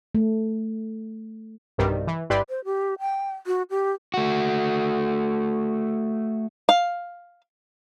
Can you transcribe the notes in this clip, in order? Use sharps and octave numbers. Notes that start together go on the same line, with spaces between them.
A3
B1 G2 C3 D#3 G3
E3
G1 E4 G4 B4 D5 C6
C5
G4
G5
F#4
G4
A3 F#4
F5